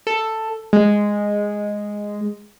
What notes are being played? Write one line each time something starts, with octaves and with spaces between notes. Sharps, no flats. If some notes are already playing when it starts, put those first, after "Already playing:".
A4
G#3